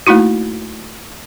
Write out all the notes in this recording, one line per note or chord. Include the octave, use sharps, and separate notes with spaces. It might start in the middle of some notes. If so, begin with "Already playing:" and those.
A3 A#3 D#4 E4 F#4